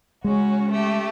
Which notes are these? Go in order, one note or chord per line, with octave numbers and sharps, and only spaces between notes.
C#3 G#3 C#4 F#4
A3 G4